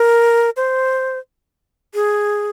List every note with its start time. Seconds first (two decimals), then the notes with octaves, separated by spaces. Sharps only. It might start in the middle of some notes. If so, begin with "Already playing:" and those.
Already playing: A#4
0.57 C5
1.94 G#4